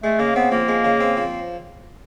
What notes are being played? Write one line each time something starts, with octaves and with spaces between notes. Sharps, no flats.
G#3 A3
C#3 A#3
B3 C4
F3 A#3
G#3
C#3
C4
F3